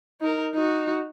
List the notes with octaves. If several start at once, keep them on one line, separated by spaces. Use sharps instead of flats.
D#4 A#4
D#4 F#4